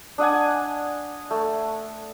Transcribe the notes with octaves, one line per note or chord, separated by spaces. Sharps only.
D4 D#5 F#5 G#5
A3